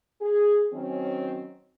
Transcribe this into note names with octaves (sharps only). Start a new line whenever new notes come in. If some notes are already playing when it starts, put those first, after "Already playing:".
G#4
D#3 F#3 C4 C#4